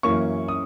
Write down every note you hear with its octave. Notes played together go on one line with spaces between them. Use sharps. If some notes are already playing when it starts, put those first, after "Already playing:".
F#2 E3 A#3 C#4 C#6
D#6